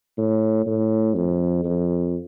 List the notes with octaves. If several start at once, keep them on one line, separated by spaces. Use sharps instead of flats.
A2
A2
F2
F2